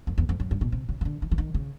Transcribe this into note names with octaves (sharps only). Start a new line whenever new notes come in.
F2
E2
F2
F#2
G2
B2
C3
C#3
C#3
D3
D#3
E3
D#3
C#3